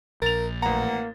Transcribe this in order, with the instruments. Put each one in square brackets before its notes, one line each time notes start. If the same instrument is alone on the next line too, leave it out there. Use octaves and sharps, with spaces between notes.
[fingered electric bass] A#1 [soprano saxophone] A#4 [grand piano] A6 F7
[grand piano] A1 A#5 [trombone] A#3 [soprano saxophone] F#5